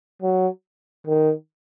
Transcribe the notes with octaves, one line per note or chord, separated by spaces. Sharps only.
F#3
D#3